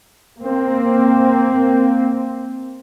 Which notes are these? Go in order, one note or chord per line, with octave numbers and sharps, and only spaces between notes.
A#3 C4